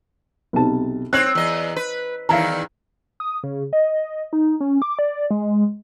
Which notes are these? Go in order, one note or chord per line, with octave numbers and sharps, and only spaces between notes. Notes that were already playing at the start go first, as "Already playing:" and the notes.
B1 C3 A5
C4 C#5 F#6
E2 D#5
B4
E2 D#3 E4 F5 A#5
D#6
C#3
D#5
D#4
C#4
D6
D5
G#3